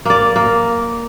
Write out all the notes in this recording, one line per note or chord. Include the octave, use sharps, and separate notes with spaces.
A#3 D5
A#3